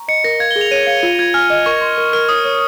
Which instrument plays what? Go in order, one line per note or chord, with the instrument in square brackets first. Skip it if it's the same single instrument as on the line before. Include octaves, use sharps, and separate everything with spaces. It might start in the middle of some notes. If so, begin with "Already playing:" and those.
Already playing: [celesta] A#5 C#6
[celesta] D#5 [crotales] C#7
[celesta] A#4 [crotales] A#6
[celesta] F5 [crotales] G#6
[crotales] G7
[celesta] G#4
[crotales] F7
[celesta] C#5 [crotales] D#7
[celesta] F5 [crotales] C#7
[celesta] F4
[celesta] F4 [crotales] G#6
[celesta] G#5 [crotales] F6
[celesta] D#5
[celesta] A#4 [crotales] C#6
[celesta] C6
A#4
[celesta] A#4 [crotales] F6
[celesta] C#5 [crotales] D#6
[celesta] C#5